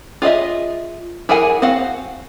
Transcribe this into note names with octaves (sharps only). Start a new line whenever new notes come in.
F4 G#4 D#5 E5
E4 G#4 A#4 F#5 G#5
C4 F#4 F5 F#5